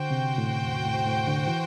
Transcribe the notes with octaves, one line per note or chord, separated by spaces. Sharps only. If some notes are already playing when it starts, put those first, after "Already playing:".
Already playing: D3 F#4 C5 G5
C3
A2
E2
A2
A2
D3
E3